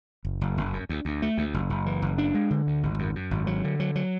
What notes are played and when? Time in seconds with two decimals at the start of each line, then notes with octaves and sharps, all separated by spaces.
0.25 F#1
0.41 F#1
0.57 F#1
0.73 F#2
0.89 D2
1.05 D2
1.22 A3
1.38 D2
1.54 F#1
1.70 F#1
1.86 E3
2.02 F#1
2.18 D4
2.34 G#3
2.50 D3
2.67 D2
2.83 G#1
2.99 F#2
3.15 F#2
3.31 G#1
3.47 F#3
3.64 D3
3.80 F#3
3.95 F#3